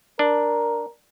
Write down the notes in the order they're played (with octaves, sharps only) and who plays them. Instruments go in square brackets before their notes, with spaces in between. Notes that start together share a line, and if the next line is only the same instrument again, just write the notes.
[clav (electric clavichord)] D4 [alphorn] A#4